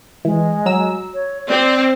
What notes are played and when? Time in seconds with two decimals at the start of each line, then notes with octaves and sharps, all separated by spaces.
0.25 E3 G#3
0.66 F#3 A#5 E6
1.14 C#5
1.49 C4 D5